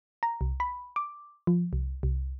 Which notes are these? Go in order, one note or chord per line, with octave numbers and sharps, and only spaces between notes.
A#5
C2
B5
D6
F3
C2
C2